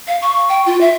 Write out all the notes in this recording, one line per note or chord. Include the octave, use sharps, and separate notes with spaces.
F5
C#6
G5
F4
E5